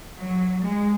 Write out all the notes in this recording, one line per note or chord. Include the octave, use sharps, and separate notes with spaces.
F#3
G#3